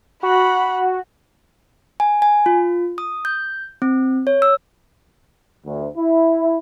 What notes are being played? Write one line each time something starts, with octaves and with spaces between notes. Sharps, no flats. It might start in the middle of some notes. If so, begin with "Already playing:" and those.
F#4 F#5 B5
G#5
G#5
F4
D#6
G6
C4
C#5
E6
D2
E4